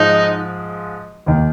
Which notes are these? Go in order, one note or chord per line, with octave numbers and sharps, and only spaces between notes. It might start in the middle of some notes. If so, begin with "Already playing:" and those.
Already playing: G#2 F3 G#3 D#4 F4
D#2 D#3 A#3